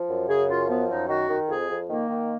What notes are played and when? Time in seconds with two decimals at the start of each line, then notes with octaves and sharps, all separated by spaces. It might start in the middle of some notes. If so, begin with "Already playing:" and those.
Already playing: F3
0.09 F#2
0.28 C#3 G#4
0.49 F#2 F4
0.68 F3 B3
0.89 F#2 D#4
1.09 D#3 F#4
1.29 D#3
1.49 F2 G#4
1.69 F2
1.89 D#3 A#3
2.09 D#3